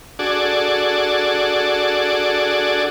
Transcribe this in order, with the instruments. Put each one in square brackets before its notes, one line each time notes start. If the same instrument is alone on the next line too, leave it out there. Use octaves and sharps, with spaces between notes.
[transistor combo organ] D4 F#4 G#4 A4 D5